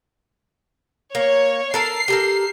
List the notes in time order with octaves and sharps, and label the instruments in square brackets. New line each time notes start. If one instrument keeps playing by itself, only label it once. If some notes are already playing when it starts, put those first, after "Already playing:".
[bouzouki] A#3 [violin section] C#5
[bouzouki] A4 A#4 A5 [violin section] C7
[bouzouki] G4 A4 A#4